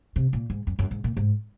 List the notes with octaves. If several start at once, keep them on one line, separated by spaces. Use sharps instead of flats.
C3
A#2
G#2
F#2
F#2
G#2
A#2
G#2